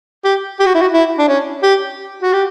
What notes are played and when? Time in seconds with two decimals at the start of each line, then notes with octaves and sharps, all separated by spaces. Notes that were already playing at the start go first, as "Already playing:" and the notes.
0.24 G4
0.59 G4
0.66 F#4
0.75 E4
0.82 F#4
0.93 E4
1.18 D4
1.28 C#4
1.63 G4
2.22 F#4
2.33 G4